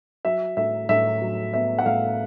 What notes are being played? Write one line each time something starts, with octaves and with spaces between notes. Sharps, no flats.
F#3 E5
A2 E5
A2 E5
F#3
B3 E5
F#5
A2 F5